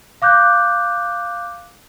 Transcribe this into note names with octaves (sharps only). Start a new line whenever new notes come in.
F5 D6 F#6 G6